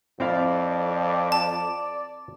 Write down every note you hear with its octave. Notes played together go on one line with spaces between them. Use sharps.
F2 C4 E4 D5 F5
A5